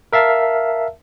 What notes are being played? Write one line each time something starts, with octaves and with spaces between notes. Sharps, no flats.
A#4 E5 F5 A5